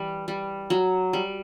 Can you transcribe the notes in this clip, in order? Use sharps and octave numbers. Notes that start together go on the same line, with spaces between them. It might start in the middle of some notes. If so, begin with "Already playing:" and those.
Already playing: E3 G3
G3
F#3
G3